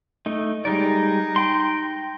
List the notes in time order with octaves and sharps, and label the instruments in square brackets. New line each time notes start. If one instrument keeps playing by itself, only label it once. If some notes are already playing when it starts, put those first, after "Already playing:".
[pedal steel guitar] A3 D#4
[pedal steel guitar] G3 G#3 D5 [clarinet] D#4
[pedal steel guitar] G5 C6